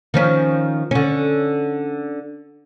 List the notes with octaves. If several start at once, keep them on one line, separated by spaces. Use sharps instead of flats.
D#3 F3 C#4
D3 C#4